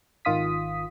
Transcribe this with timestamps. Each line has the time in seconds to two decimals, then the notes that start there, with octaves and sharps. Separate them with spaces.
0.25 G#1 D#3 F4 D#6 B6